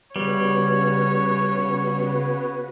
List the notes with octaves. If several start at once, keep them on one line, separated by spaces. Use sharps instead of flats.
C#3 G3 B3 F#4 B4 C#5